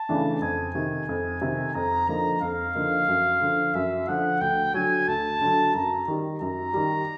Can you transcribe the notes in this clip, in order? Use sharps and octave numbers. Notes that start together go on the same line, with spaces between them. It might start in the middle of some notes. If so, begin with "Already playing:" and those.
Already playing: A5
C#3 E3 A3 D4
F2 G#5
C3 D#3
F2
C3 D#3
F2 A#5
D3 F3 A#3 D#4 A#5
F2 F5
D3 F3 A#3 D#4
F#2
D3 F3
F#2 E5
D3 F3 F#5
D2 G5
D3 F#3 G#5
D2 A5
D3 F#3
F#2 A#5
D#3 G3
F#2 A#5
D#3 G3